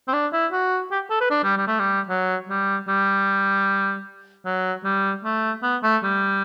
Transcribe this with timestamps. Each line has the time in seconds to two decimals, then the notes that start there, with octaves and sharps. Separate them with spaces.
0.08 C4
0.13 D4
0.33 E4
0.52 F#4
0.91 G4
1.10 A4
1.21 B4
1.31 D4
1.44 G3
1.57 G3
1.68 A3
1.79 G3
2.09 F#3
2.49 G3
2.88 G3
4.45 F#3
4.84 G3
5.24 A3
5.63 B3
5.83 A3
6.03 G3